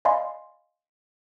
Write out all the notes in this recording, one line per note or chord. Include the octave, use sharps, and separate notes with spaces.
D5 D#5 F5 G#5 B5 C6